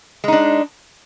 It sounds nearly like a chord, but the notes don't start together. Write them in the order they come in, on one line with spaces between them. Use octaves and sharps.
G#3 D#4 D4